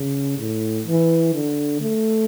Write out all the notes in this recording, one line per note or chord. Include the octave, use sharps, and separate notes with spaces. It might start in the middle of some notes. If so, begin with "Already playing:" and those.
Already playing: C#3
A2
E3
D3
A3